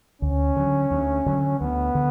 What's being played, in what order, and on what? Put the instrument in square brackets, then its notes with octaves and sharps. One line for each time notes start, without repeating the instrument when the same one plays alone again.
[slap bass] D2 [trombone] C#4
[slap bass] D3 F#3
D2
D3 F#3
[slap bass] D2 [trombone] B3
[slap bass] D3